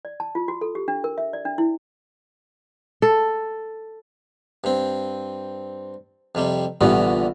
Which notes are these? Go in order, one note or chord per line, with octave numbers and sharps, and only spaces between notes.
D5
A5
F4
F#4
A4
G4
D4
A#4
E5
D5
D4
E4
A4
G2 C4
F2 C3 G3
A#1 D3 E3 G3 B3